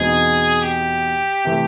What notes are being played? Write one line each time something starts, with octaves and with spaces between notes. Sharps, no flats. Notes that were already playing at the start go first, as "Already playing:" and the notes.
Already playing: E2 B2 G#3 C4 D#4 G#4
G4
C3 E3 A3